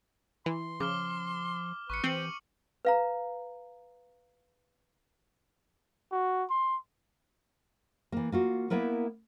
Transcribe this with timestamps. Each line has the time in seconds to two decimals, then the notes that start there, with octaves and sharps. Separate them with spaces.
0.46 E3 C6
0.80 C#3 F3 D6 F6 G7
1.90 A1 B4 C#6 C#7
2.04 E3 C4 G4 D#7 F#7
2.85 B4 F5 A#5
6.12 F#4
6.50 C6
8.12 E3 A#3
8.32 A#3 F4 F#4
8.70 A#3 B3 E4 A#4 B4